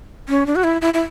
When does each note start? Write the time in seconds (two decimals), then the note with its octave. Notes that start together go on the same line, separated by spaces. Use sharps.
0.29 C#4
0.46 D4
0.56 F#4
0.64 E4
0.81 E4
0.94 E4